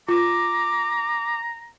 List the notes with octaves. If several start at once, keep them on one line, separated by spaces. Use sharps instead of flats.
F4 A#5 D6